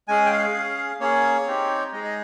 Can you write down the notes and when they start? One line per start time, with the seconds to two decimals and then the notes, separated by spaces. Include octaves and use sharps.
0.08 G#3 C#4 G#4 G#5
0.26 G5
0.31 F5
0.54 C#4 G#4
1.00 A#3 C#4 G#4 C#5
1.47 C4 D#4 G4
1.92 G#3 D#4 G#4 D#5
2.04 D#5